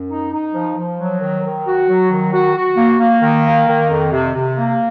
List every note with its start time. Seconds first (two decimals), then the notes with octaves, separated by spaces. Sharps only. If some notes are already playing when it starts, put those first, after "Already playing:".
Already playing: F#2
0.09 D#4
0.32 D#4
0.54 F3
0.76 F3
0.99 F#3
1.21 D#3
1.44 D#3
1.65 F#4
1.88 F#3
2.10 D#3
2.32 F#4
2.55 F#4
2.77 A#3
2.99 A#3
3.21 D#3
3.45 A#3
3.67 D#3
3.89 F2
4.11 C3
4.34 C3
4.56 A#3